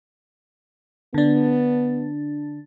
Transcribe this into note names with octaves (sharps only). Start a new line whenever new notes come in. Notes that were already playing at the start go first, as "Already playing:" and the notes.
D3 B3 D4